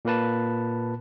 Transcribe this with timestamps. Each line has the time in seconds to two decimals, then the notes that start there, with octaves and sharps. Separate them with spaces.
0.05 A#2 A#3 B4 A5